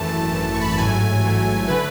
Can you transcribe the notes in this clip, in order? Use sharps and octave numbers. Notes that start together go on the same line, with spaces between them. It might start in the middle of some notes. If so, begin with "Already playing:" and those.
Already playing: G#1 F#2 E3 A3 A5
G#1 F#2 E3 A3
C#6
B5
A5
A1 G#2 F#3 A3 G#5
A1 G#2 F#3 A3
D3 A3 B4